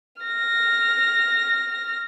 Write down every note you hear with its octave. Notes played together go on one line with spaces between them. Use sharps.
F6 A#6